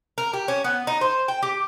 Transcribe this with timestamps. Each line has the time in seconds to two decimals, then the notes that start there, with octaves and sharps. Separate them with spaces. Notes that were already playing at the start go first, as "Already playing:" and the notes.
0.18 A#4
0.33 G4
0.48 C#4
0.64 B3
0.87 D#4
1.01 C5
1.28 G5
1.43 G4